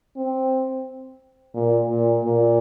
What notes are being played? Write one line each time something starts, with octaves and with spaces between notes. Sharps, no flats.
C4
A#2
A#2
A#2